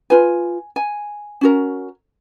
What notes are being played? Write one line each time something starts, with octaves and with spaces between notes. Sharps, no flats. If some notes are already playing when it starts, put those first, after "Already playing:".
F4 B4 G#5
G#5
C#4 F#4 A#4